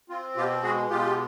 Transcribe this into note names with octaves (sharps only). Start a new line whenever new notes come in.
C4 F4
B2 F4 G4
G#3 F#4 G#4
B2 F4 G4